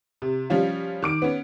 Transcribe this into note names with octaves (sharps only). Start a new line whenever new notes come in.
C3
F3 G3 C#4 F4
D#3 D6 D7
B3 C#4